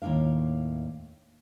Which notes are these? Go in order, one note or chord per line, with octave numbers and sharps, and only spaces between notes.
D#2 A2 C#4 D4 F5